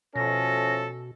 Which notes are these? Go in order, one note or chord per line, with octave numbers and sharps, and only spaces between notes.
B2 F3 A3 C#4 A4 A#6